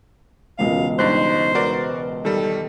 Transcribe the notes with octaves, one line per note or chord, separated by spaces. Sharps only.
E1 C#2 F#2 F5
G2 D#4 C5 F#6
F#4 A#4 B4 D5
D#3 G3 A4